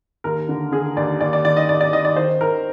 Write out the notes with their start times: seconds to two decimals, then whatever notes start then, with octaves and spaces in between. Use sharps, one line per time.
0.24 D#2 A#4
0.49 D3
0.72 D3 G#4
0.96 D#2 D5
1.21 D#2 D5
1.33 D5
1.45 D#3 D5
1.57 D#5
1.69 D#2 D5
1.81 D5
1.93 D#3 D#5
2.05 D5
2.16 D#3 C5
2.41 D#3 A#4